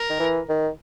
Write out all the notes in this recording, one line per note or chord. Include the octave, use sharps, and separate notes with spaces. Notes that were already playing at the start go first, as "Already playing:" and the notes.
Already playing: A#4
D#3
E3
D#3